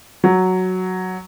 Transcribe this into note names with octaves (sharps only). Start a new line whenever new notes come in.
F#3